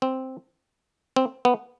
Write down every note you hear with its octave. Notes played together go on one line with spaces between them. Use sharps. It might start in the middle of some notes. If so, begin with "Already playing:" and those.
C4
C4
B3